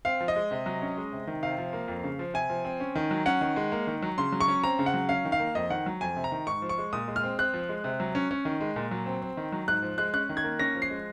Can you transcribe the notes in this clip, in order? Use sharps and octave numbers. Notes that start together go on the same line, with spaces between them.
C4 F5
F3
D#5
G#3
C3
F#3
C#4
G#3
C3
D#3
C3 F5
F3
A#3
F2
C#3
F3
C3 G#5
F3
C4
C#4
D#3
F#3
C#4 F#5
D#3
G#3
A#3
D#3
F#3
C#3 C6
F#3
C#6
C#4
C4 A#5
C#3
F#5
F#3
C#4 F5
D#3
F5
A#3
F2 D#5
D#3 F#5
F#3
F2 G#5
C3
A#5
D#3
G#2 C#6
F3
C#6
G#3
A#2 D#6
G#3
F6
C4
C4 F#6
F3
G#3
C3
F#3
C#4
C#4
D#3
G#3
A#2
F#3
C4
C4
D#3
F#3
G#2 F#6
F3
G#3 F#6
C#4 F#6
D#3
G#6
A#3
C#4 A#6
F3
C7
G#3